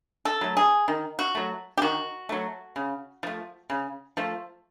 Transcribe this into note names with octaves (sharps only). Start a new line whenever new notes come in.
A4
F#3 A3
G#4
D#3
F#4
F#3 A3
G4
D#3 F#4
F#3 A3
C#3
F3 A3
C#3
F3 A3